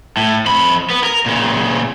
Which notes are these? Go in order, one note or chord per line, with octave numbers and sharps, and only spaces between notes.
A2
F2 B5
B3
A#4
A#2 C#3